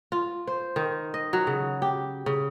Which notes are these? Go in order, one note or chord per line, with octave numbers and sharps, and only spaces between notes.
F4
C5
D#3
D#5
F#3
C#3
G4
C#3